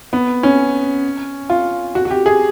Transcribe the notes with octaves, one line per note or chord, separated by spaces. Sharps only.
B3
C#4
F4
F#4
F#4
G4
G#4